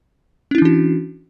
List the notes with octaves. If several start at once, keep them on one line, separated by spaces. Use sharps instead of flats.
E3 C#4 D4 E4 F#4